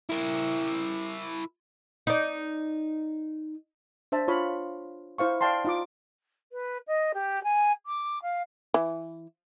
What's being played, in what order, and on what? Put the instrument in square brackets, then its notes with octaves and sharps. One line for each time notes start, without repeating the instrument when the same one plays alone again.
[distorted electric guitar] E4 A#4
[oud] D#4 D5
[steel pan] D4 C5 E5 A5
F4 C#5 F5 B5
E4 C5 F5 C#6
D5 F5 G5 A5 C6
D#4 F4 D6
[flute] B4
D#5
G4
G#5
D6
F5
[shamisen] E3